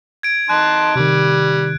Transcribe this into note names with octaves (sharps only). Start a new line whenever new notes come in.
G#6 D7
D#4 A5 C6 F#6
C3 D#3 G3